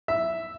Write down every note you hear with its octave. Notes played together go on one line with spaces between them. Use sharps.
E5